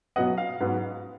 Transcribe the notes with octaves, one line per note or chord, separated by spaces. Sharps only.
B2 F#3 B3 D#5 F#5
F5
G#2 F#3 B3